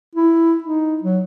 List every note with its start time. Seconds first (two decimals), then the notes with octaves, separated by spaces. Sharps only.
0.15 E4
0.63 D#4
1.02 F#3